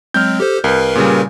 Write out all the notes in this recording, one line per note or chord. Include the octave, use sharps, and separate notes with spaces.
F#3 G#3 C4 F6 G6
G4 A4 C5
C2 A#4 B4
A#2 C#3 G3